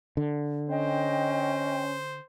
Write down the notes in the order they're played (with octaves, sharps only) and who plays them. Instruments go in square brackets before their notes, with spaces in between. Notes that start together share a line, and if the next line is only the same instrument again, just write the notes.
[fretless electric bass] D3
[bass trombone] C#4 [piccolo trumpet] C5 [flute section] D#5 G5